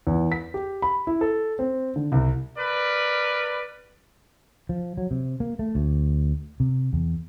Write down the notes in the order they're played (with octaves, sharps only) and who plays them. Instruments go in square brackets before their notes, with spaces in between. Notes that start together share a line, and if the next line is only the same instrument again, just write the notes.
[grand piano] E2
B6
G4
B5
E4
A4
C4
D3
C2
[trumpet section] A#4 B4 D5
[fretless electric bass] F3
F#3
C3
A#3
A3
D2
C3
E2